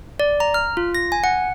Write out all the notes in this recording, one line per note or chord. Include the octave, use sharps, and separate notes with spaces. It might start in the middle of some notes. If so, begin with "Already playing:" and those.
D5
A#5
F6
F4
A#6
G#5
F#5